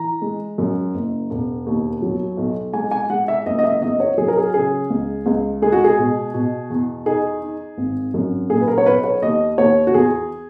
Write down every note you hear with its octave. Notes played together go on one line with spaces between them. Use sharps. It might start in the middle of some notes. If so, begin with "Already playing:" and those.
Already playing: E3 A#5
G#3
F#2
F#1
E1
D#2
F#3
B1
G#3 G#5
G#5
G#3 F#5
E5
F#1 D#5
D#5
E5
E2 D#5
C#5
F#3 G#4
A#4
G#4
C#3 G#4
C#2
C#2
G#3 G#4
F#4
G#4
B2
B2
E2
D#4 G#4
D#4
G#1
F#2
A#2 G#4
B4
A#4
C#5
B1 B4
C#5
D#2 D#5
D#2 C#5
F#4
E2 G#4